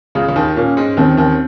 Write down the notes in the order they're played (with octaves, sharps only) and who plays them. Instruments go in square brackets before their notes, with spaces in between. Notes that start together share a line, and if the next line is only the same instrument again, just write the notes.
[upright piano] C#2 C#3 [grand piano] G#4
[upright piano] C#3
D#2 D#3
[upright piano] A#2 A#3 [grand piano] C#4
[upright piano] G#2 G#3
[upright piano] D#2 D#3 [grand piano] C4
[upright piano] D#2 D#3